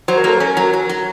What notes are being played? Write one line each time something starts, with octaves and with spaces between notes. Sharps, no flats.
F#3 C5
A#4
A#3 A4
C#4 A#4
F#3
F#3
F#3